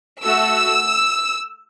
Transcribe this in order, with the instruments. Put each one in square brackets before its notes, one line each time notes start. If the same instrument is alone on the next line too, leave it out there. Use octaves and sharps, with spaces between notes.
[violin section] A3 F#4 A4 E6